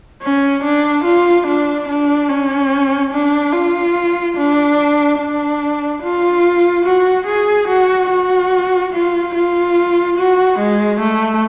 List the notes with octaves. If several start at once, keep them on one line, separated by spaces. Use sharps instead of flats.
C#4
D4
F4
D4
D4
C#4
D4
F4
D4
D4
F4
F#4
G#4
F#4
F#4
F4
F4
F#4
G#3
A3